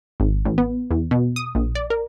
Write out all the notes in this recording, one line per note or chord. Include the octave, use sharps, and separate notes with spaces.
G#1
A1
B3
E2
B2
D#6
A#1
D5
A#4